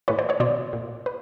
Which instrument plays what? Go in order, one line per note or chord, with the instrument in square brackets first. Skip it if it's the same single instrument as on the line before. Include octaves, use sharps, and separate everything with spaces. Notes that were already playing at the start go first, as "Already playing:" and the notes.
[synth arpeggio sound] A2 E3 B4 C#5
C5 D5
C#5 D#5
B2 C5 D5
A#2
B4